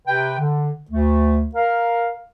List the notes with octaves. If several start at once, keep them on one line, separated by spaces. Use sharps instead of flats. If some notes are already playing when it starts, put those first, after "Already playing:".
C3 B4 G5
D3
D2 A3
A#4 F5